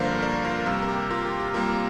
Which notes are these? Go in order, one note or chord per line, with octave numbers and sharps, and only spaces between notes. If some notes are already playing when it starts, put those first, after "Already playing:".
Already playing: G2 D3 F3 A#3 A#4 C5 D5 F5
A#4 D5
F4 A#4
C3 G3 A#3
A#4
G4
F4 A#4
G4
G4
C3 G3 A#3 F4 A#4